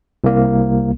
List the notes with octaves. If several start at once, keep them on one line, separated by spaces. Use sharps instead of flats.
C2 A#3